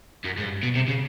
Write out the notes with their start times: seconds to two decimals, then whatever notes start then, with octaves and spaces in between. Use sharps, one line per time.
0.24 F#2
0.38 G#2
0.43 G2
0.63 B2
0.75 C3
0.88 C#3